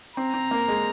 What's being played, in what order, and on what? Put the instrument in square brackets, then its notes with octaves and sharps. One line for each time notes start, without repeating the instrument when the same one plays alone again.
[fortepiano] C4 [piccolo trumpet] A#5
[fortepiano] C4
A#3
G#3